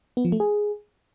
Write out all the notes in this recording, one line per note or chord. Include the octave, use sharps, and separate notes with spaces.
B3
F3
A3
G#4